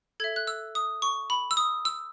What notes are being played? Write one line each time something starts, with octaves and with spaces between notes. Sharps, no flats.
A4 E5 G#6
F#6
E6
D#6
C#6
B5
E6
D#6
E6